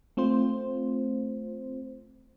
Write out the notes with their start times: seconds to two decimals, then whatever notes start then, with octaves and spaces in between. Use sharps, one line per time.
0.17 A3 C4 F4 C5